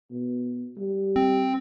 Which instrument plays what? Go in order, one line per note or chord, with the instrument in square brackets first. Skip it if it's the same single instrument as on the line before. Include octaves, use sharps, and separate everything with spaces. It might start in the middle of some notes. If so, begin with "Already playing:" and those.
[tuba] B2
G3
[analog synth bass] C4